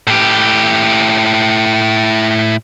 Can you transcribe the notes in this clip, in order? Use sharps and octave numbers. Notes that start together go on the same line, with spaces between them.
A2 G4